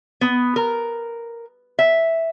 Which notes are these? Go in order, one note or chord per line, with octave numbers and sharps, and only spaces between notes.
B3
A#4
E5